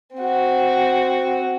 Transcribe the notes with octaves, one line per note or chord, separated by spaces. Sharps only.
C4 F#4